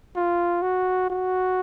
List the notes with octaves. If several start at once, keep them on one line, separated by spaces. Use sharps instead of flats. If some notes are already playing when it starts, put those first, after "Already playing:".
F4
F#4
F#4